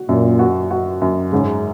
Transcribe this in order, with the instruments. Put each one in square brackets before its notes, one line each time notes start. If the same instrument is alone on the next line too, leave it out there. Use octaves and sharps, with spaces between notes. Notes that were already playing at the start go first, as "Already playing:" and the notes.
Already playing: [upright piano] F#4
[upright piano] F#2 [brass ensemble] A#2
[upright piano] F#4
F#4
F#2
[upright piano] G#2 [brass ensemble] C#3